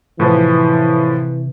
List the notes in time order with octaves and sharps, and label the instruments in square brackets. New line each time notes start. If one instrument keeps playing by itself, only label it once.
[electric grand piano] A2 F3 [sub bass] C3 [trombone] E3